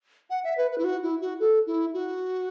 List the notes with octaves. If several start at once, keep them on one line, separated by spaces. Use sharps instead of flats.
F#5
E5
B4
B4
E4
F#4
E4
F#4
A4
E4
F#4